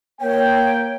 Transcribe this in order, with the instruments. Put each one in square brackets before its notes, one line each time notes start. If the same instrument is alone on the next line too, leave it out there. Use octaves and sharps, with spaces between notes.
[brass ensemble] A#3 G5 [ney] C#5